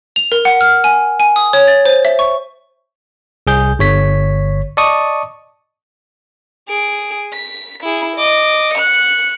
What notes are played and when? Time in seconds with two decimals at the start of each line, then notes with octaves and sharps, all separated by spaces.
0.16 F7
0.32 A#4
0.45 F#5
0.61 F6
0.84 G#5
1.20 G#5
1.36 D#6
1.53 C#5
1.68 A6
1.86 C5
2.05 E5
2.19 C#6
3.47 C2 G#4 G6
3.79 G1 C#5 B6
4.77 D5 D#5 A5 C#6 D#6
6.69 G#4 D7
7.33 B6
7.83 E4 G#4
8.16 D#5 D6
8.74 F#6 C#7